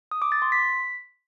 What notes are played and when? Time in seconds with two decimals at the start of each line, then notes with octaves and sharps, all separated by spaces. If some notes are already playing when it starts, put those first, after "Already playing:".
0.11 D#6
0.22 D6
0.32 A6
0.42 C6
0.52 B6